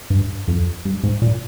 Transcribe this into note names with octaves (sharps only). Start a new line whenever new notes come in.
G2
F2
G2
G#2
A#2